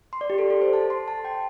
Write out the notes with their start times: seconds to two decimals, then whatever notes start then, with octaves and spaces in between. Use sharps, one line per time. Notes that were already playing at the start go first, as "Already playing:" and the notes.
0.13 C6
0.21 D5
0.30 G4
0.38 A4
0.50 A4
0.62 C5
0.73 A5
0.90 C6
1.08 A5
1.25 G5